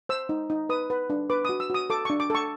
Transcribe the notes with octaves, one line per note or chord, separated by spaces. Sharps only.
C5 E6
D#4
D#4
B4 D#6
B4
D4
B4 D6
F#4 D#6
E6
F#4 D#6
A4 D6
D4 C#6
D6
A4 C#6